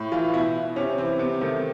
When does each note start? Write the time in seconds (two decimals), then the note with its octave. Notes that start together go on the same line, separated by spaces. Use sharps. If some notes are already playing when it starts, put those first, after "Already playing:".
Already playing: A2
0.12 E3 F4
0.33 B2 E4
0.76 C3 C#4
0.98 E3 C4
1.19 C3 B3
1.41 D#3 A3